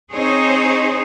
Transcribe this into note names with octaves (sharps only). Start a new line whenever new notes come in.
C4 D#4 G#4 C5 C#5